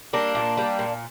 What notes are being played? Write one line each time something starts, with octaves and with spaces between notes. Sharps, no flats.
G3 A#3 D4
A#2
G3
A#2